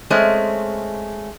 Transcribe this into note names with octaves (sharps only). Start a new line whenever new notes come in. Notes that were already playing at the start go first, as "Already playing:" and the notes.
G#3 A3 C4 C#4 D#5